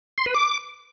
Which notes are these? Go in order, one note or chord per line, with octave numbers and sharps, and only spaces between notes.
C6
B4
D6